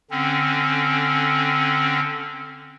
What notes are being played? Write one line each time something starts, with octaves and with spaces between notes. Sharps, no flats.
D3 C4 C#4